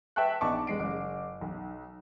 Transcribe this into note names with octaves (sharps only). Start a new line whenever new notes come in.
B4 E5 G5 A5 C#6 F#6
A#1 B3 D#4 A5 C#6 D6
F1 G#3 C7 D7
F#1 D6
B1